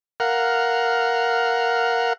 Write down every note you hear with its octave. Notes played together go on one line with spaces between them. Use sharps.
A#4 F5 F#5